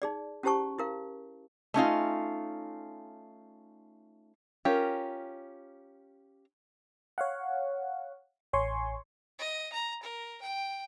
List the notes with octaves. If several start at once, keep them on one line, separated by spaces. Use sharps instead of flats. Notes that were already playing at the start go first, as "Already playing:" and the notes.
D#4 G#4 D5
C#4 E4 G4 C5 A5 C#6
E4 A#4 F5
A3 C#4 D#4 F4
C#4 F4 G4 A#4
C#5 F5 F#5
A1 C#5 G#5 C6 C#6
D#5
A#5
A#4
G5